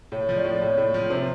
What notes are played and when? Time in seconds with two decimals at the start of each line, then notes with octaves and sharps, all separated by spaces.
0.12 A2 C#5
0.29 F3
0.37 D5
0.45 A2
0.61 A2 C#5
0.77 A2
0.94 F3
1.10 C3 C5